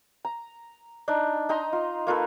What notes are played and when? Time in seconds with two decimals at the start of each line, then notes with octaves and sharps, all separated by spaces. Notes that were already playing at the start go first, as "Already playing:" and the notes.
0.25 A#5
1.08 D4 D#4
1.49 D#4 D#5 A#5 C6
1.73 F4
2.07 A#3 F4 A4 B4